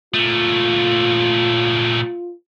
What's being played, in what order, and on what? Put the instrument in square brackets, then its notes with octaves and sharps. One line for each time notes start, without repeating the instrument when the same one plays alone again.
[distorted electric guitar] A#2 A3 [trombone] F4